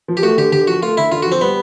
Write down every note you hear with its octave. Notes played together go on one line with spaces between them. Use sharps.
F3
G4
A3 F#4
D3 G4
D3 G4
F3 F#4
A3 F4
D3 E4
D3 F4
F#4
F3 C4
G3 B3